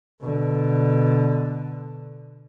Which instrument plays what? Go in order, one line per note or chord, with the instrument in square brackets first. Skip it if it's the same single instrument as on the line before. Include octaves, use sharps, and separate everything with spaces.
[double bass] B2 D3